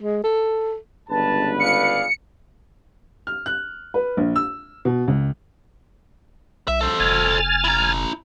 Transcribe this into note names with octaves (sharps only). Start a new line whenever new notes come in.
G#3
A4
G1 C#2 B4 A5
G#4 D5 F5 C#7
F6
F#6
B4
A#1
E6
B2
C#2
B1 E5
A4 C5
F1 G#5 F6 A6
E4 A#5